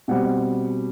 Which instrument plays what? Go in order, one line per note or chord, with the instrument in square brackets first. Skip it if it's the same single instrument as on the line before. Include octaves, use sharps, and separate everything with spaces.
[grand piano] B2 G3 C4 F#5